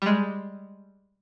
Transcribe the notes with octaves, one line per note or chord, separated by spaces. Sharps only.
G3 G#3